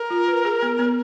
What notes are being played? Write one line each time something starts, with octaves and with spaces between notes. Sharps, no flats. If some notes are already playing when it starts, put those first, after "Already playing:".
Already playing: A#4
F4
B4
G#4
B3
B3